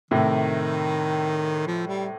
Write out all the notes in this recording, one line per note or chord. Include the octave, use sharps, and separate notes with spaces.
A2 C3 D#3
F3
G3